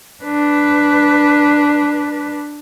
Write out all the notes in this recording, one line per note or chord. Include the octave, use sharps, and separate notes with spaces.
D4 B4